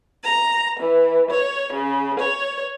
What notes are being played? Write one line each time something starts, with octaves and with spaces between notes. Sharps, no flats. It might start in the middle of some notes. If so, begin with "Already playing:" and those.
A#5
E3
C#5
C#3
C#5